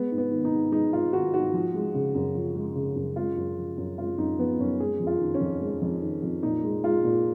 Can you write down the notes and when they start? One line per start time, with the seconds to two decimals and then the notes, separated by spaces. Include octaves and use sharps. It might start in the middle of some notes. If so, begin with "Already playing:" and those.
Already playing: G#3 B3
0.11 G#2
0.18 B3
0.31 D#3
0.45 D#4
0.52 G#2
0.72 G#3 D#4
0.93 G#2 F4
1.13 D#3 F#4
1.33 G#2 F#4
1.53 F3
1.74 G#3
1.94 C#3
2.15 F#2
2.35 F3
2.55 G#3
2.75 C#3
2.96 F#2
3.16 G#3 F4
3.37 F#2
3.58 F3
3.77 F#2
3.98 G#3 F4
4.18 F#2 D#4
4.39 F3 B3
4.59 F#2 C#4
4.80 G#3 G#4
5.00 F2
5.07 F4
5.20 D#3
5.34 C#4
5.41 F2
5.61 G#3
5.82 F2
6.01 D#3
6.22 F2
6.43 A#2 D#4
6.63 G#3
6.84 G#3 F4
7.04 A#2